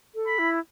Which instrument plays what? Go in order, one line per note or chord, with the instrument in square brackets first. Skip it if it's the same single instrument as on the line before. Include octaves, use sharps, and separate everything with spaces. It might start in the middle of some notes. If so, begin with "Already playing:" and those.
[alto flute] A4
[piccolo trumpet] B5
[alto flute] E4